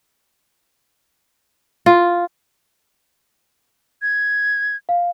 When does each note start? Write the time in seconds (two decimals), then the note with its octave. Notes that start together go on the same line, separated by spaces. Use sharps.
1.86 F4
4.02 G#6
4.89 F5